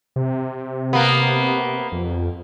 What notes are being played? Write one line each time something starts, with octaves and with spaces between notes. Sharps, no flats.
C3
A#3 B3
F2